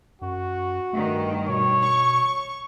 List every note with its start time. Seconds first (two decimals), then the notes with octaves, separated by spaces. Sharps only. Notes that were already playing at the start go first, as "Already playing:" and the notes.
0.22 F#2 F#4
0.93 G2 D#3 A3
1.48 B2 C#5
1.82 C#6